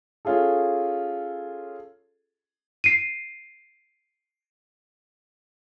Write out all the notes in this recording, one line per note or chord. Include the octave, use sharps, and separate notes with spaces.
C#4 F4 G#4 A4
C7 D7 D#7